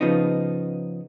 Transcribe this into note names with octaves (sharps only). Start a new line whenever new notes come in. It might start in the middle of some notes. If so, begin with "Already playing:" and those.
C#3 F3 B3 D#4